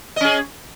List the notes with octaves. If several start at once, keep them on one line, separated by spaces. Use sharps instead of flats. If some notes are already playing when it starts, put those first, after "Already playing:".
C#4 G#4 D#5